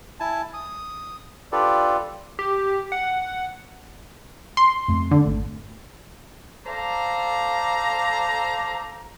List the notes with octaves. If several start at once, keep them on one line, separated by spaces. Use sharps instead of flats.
E4 G#5 A5
D#6
D4 F4 G4 A4 B4 D5
G4
F#5
C6
F2 A3
D3
G#1 A3
A4 C5 D5 F5 A#5